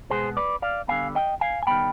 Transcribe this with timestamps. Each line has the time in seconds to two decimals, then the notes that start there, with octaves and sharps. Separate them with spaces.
0.10 B2 G#3 B3 G#4 C5
0.37 B4 D5
0.62 D5 F5
0.88 D3 G3 B3 F5 G#5
1.15 D#5 G5
1.41 F5 G#5
1.63 G#5
1.67 D#3 G3 B3 G5 B5